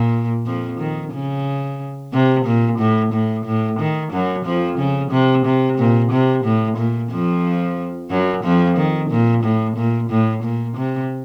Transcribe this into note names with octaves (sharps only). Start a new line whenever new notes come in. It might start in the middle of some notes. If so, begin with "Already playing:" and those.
Already playing: A#2
F2 F3
D#3
C#3
C3
A#2
A2
A2
A2
D#3
F#2 F#3
F2 F3
C#3
C3
C3
A#2
C3
A2
A#2
F2 F3
F#2 F#3
F2 F3
D#3
A#2
A2
A#2
A2
A#2
C3